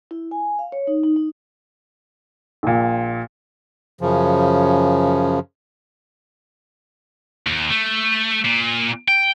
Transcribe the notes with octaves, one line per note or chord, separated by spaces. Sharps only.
E4
G#5
F5
C#5
D#4
D#4
D#4
A#1 A#2
F#2 C#3 F3
D#2
A3
A#2
G5